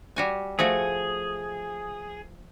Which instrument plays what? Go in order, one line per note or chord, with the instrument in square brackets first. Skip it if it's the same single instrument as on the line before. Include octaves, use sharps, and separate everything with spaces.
[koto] G3 F#4 G#5
[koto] F3 A3 F#4 [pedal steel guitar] G#4